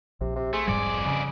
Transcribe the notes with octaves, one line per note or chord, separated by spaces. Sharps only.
A#1 C3
C3
A3 G#4 C6
F1 F2 G#2 G3 D5
C#3